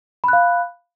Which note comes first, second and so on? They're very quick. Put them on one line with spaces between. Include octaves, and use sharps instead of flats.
B5 F#6 F5